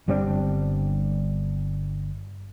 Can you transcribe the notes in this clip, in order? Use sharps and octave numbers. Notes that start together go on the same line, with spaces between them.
G1 G3 C4 D4